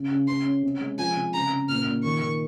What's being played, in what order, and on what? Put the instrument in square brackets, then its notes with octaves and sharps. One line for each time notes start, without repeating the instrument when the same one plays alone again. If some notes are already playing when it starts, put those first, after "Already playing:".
Already playing: [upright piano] C#3
C#3
[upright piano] C#3 [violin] C6
[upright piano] C#4
C3
G#3
[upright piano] F3 [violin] G#5
[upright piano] C3
[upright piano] C#3 [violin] A#5
[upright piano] C#3
[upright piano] A#2 [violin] F6
[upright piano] A#2
[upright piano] D#3 [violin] C#6
[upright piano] D#3